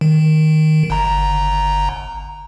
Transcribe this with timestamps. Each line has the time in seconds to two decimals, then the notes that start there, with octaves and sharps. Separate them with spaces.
0.01 D#3
0.90 G1 A#5